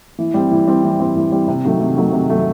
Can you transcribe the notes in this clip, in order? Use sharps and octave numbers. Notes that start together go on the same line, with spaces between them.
E3
G3 C4
E3
G3 C4
E3
G3 C4
E3
G3 C4
C3
D#3 F#3 A3
C3
D#3 F#3 A3
C3
D#3 F#3 A3